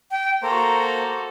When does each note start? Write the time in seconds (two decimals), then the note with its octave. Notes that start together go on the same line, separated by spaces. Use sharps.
0.11 G5
0.43 A#3 F#4 A4 C5 A#5